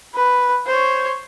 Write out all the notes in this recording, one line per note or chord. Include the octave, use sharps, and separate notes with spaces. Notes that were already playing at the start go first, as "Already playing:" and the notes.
B4
C5 C#5